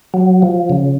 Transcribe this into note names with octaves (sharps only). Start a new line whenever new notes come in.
F#3
F3
C#3